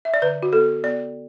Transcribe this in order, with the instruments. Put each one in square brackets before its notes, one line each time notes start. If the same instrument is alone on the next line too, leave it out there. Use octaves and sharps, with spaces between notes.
[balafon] E5
D5
D3 B4
F#4
B3 A4
B3 D5